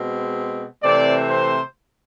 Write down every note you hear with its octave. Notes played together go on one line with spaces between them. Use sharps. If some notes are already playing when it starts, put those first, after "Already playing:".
Already playing: B2 G#3 C4
C3 E3 A3 C4 D5
C5